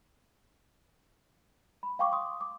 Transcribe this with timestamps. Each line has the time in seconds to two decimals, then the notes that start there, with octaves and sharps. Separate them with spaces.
1.83 B5
1.99 F5 G5 C#6 D6
2.12 C6 D#6
2.41 D6